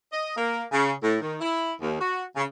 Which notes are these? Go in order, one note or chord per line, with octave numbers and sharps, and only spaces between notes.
D#5
A#3
C#3
A2
D#3
E4
D#2
F#4
C#3